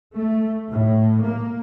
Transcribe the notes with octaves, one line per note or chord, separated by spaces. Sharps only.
A3
A2
A#3